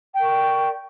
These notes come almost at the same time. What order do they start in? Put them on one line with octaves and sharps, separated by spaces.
G5 A#4 C#6 D5